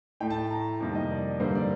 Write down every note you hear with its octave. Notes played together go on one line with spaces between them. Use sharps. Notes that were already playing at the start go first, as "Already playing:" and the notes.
A2 A3 G5
A5
A#5
F2 C3 D#3 G3 A#3 A5
D#5
D5
G2 D3 G3 A#3 C5
D5